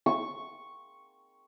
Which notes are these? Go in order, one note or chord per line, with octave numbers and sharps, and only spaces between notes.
C#6